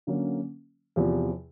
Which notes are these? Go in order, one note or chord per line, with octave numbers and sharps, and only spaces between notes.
D3 F#3 A#3 C#4
E2 C3 F3